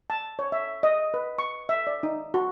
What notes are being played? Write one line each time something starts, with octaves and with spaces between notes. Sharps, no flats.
A5
C#5
E5
D#5
B4
C#6
E5
D5
D#4
F#4